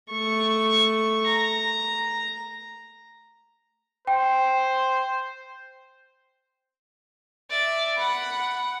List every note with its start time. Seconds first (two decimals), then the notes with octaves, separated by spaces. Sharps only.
0.12 A3 C#6
1.28 A#5
4.07 C5 G5
7.50 D5 E5
7.98 F#5 B5